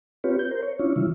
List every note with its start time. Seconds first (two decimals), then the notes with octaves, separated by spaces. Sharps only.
0.24 C4 F4 G4 B4 C#5
0.39 G6
0.51 A#4 C5
0.62 C#5
0.79 C#4 D4 E4 F4 C#5
0.96 C3 E3 G3 E4 F4